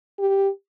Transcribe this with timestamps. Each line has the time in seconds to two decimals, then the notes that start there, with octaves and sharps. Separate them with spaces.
0.19 G4